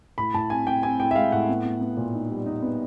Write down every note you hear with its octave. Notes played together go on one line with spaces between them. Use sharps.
A2 B5
A2 A5
C4 G#5
C4 G5
C4 G#5
A2 G5
E5
G#3 F5
A2 F#5
B3
B3
B3
A#2
D#4
G3
D#4
B3